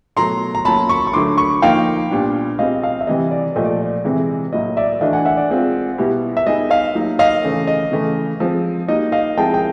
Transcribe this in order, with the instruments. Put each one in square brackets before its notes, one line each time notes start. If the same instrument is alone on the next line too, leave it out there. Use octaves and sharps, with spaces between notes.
[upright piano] B2 F#3 A3 [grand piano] A#5 C6
[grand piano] A#5
[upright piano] F#3 A#3 C#4 [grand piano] A5 B5
[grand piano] B5 C#6
C#6
[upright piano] D3 F#3 A3 [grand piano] C6 D6
[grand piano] B5 C#6
[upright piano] F3 A#3 D#4 [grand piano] F5 G5
[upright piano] A#2 G3 B3 D4
[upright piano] G3 C4 F4 G#4 [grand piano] D#5 F5
[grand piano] D#5 F5
E5
[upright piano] C3 E3 G3 [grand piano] D#5
[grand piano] D5
[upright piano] A#2 F3 A3 [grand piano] D#5
[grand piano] D5
D5
[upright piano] C3 E3 G#3
[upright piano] A2 F#3 A#3 [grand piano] D#5
[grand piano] D5 E5
[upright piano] E3 A3 D4 F#4 [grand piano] D#5 F5
[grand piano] F#5 G#5
E5 F#5
D5
[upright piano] G#3 C4 F4
B2 G3 B3 E4 G4
[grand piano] E5
[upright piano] G3 B3 D#4 G#4 [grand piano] D#5
[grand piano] D#5 F5
[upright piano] F#3 A#3 D#4
[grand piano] D#5 F5
[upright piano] C#3 E3 A3 C#4
[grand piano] D#5
[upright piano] C#3 E3 A3
F3 G#3 C4
[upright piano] G3 A#3 D#4 F#4 [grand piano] D#5
[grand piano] D#5 F5
[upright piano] F3 G#3 C4 E4 G#4 [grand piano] G5 A5
[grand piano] G5